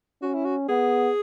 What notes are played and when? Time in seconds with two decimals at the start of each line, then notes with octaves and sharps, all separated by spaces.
0.22 C#4 F#4
0.34 E4
0.45 F#4
0.69 B3 G#4